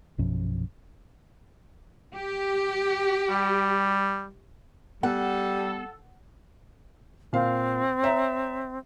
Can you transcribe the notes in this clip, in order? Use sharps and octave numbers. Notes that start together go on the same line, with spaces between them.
A#1 F#2 B2 F3
G4
G3
G3 B3 A4 F#5
A#2 C4 F5
C#5 E5 A#5